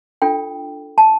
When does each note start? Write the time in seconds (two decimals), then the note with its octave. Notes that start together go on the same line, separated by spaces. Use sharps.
0.22 D4 F4 A4 G5
0.98 A5